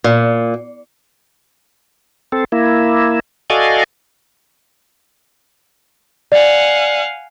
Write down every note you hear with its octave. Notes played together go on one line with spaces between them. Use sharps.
A#2
C4 A4
A#3 E4
F#4 A4 D5 D#5 F5 G#5
D5 F5 F#5 G#5